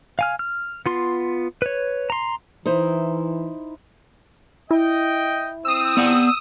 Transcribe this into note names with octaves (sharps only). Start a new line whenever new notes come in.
F5 G#5 F6
F6
B3 F4 C6
B4 C#5
A#5 C6
E3 D#4 E4 C5
E4 D#5 G5
C4 D#6 E6
B3 D5 F#5